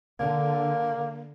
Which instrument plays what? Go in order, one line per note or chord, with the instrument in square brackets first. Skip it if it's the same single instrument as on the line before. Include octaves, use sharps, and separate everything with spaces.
[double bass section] D3 [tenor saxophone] A#3